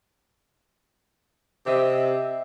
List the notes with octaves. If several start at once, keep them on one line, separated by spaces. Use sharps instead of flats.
C3 D#5 E5 G5